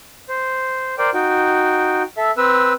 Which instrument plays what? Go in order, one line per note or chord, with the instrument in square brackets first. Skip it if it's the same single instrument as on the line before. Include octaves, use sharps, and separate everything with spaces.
[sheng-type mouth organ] C5
A#4 C5 D5 G5
D#4 F#4 G5
A4 E5
C4 B4 E6